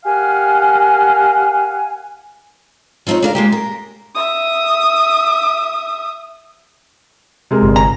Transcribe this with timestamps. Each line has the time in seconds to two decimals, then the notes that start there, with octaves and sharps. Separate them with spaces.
0.05 G4 A#4 F5 F#5 G#5
3.07 F3 C4 D4 D#4 C#5
3.22 D4 A#4 F5
3.35 G#3 A#3 G4
3.52 A#4
4.15 E5 D#6
7.51 C3 G#3 A#4
7.63 G1
7.76 G#5 A#5